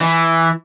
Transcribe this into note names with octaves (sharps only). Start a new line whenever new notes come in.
E3